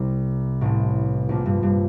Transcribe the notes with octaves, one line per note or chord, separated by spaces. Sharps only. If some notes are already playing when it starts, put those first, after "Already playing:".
Already playing: C2 C3
A1 A2
A#1 A#2
G2
G2